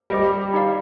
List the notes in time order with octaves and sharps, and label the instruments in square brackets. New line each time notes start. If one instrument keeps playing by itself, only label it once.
[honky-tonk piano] G3 [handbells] G4 C5 D#5 G5
[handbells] D#4 G4 D5 F5